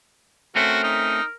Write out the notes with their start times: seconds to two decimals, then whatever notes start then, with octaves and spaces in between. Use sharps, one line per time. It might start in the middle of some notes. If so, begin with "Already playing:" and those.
0.56 A3 C4 C#4 F#4 A#4
0.84 D#4